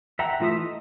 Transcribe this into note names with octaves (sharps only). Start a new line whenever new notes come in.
E5 F#5 G5 A#5
E3 A3 F4 E5 D#6
D#5